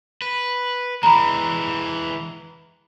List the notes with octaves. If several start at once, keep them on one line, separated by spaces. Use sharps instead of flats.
B4
E3 G#3 A#5 B5